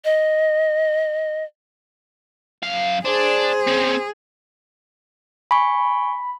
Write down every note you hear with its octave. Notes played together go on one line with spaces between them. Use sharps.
D#5
F#2 F5
D4 G#4 C5
C4 C#4
G#5 B5 C#6